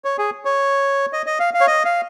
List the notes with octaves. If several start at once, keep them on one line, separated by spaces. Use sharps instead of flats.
C#5
G#4
C#5
D#5
D#5
F5
F5
C#5
D#5
F5